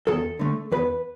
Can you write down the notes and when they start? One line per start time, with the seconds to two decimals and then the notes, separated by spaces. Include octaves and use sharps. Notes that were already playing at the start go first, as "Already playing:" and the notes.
0.07 E2 A4
0.39 D3 A3
0.72 E2 B4